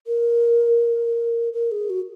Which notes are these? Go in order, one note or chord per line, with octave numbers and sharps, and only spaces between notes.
A#4
A#4
G#4
F#4